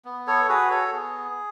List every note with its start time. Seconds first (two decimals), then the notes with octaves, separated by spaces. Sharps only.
0.05 B3
0.27 A4 C#5
0.49 F#4 G#4 B4
0.71 A4 C#5
0.92 B3 G#4